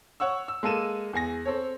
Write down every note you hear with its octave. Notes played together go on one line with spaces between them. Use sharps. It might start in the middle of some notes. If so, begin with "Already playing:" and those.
C#5 F#5 C#6 E6
E6
G#3 A#3 A4 D#7 E7
E2 G#4 G#5 A#6
C4 A4 C#5